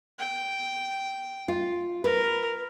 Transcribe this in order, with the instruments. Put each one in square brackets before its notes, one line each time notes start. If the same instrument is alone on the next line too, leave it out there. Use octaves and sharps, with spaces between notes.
[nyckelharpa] G5
[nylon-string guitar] F4
[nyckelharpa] A#4 [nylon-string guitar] B4